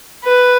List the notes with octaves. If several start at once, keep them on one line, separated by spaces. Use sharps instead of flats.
B4